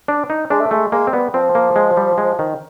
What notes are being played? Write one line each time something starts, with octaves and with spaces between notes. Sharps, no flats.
D4
D#4
G#3 D4
A3
G#3 A3
G#3 A#3
C4
G3 B3
F3 C4
A#3
G#3
G3
G#3
D#3